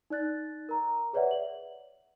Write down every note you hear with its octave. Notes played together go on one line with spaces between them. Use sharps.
D#4 D5 F#6 A6
A#4 A#5
G#4 B4 C#5 D5 E5 F#5
F#7